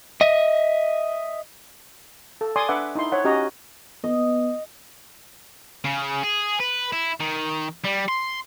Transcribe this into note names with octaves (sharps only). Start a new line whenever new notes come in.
D#5 E5
A4
D5 G#5 C6 D6 D#6
D4 B4 E5 F#5 D6
D#4 E4 C6
C5 C#5 F#5
C#4 F#4 G4 D#5 A#5
B3 D#5
C#3
G#4
B4
E4
D#3
G3
C6